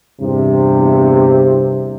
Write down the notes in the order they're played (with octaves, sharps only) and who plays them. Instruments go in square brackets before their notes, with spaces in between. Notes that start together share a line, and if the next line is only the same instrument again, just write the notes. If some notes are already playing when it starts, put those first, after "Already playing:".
[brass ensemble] E2 G2 C3